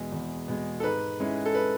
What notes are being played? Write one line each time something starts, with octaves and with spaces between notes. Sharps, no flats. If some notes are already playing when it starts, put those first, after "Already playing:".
Already playing: E2 B2 G#3
E2
B2 G#3
A4
G#2 B4
G#3 C#4 E4
A4
B4